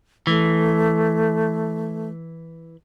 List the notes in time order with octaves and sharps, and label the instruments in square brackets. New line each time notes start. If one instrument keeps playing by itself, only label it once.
[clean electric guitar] E3 [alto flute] A3